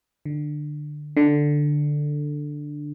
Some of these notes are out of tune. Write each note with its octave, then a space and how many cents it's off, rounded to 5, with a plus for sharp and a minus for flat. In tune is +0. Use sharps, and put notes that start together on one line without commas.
D3 +20
D3 +5